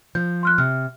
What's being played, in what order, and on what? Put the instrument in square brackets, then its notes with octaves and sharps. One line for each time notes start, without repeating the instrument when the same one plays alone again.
[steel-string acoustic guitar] F3 [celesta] G6
[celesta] C6 F6 F#6
[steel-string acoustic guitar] C3 [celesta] F6